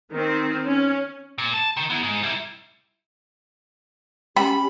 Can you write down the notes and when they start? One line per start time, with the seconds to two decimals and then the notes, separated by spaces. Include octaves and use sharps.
0.11 D#3 C4
0.65 C#4
1.38 A#2
1.54 A5
1.77 D#3
1.90 B3 E4
2.03 G#2
2.23 G3 E4
4.36 C#4 G4 G5 B5